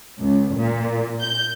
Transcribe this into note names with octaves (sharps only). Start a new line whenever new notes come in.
C#2
A#2
G6